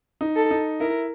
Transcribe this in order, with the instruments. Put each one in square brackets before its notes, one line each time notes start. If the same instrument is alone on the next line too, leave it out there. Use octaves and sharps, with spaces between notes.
[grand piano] D#4
[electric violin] A4
[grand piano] D#4
[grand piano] E4 [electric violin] A#4